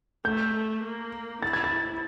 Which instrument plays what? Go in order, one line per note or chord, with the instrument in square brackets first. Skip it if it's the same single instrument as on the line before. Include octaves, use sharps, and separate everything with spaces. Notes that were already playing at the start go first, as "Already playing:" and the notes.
[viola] A3 [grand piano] G6
[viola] A3
A#3
[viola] E4 [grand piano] A6
[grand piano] G#6
A6